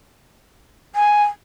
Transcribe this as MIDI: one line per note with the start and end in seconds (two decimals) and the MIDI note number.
0.95 1.24 80